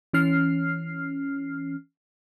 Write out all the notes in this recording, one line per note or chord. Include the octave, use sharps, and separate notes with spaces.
E3 C#4 F6 C7